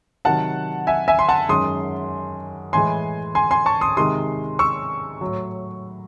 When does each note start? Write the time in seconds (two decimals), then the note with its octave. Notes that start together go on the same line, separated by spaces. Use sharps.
0.25 C3 D#3 F#3 F#5 A5
0.87 E5 G#5
1.08 E5 G#5
1.19 C6
1.28 F#5 A5
1.49 F#2 D#3 G#3 C6 D#6
2.73 A2 E3 G#3 G#5 C6
3.35 G#5 C6
3.51 G#5 C6
3.66 A5 C#6
3.81 C6 D#6
3.97 C3 D#3 G#3 C6 D#6
4.59 C#6 E6
5.21 A2 F#3